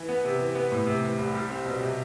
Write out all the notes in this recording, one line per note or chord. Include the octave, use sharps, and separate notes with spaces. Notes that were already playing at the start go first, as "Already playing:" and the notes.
Already playing: E3
B3
C3
E3
B3
A2
C3
E3
C2
G3
C4
B2
C3